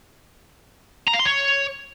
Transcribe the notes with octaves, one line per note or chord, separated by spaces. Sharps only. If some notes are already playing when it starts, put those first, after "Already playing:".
A#5
F5
C6
C#5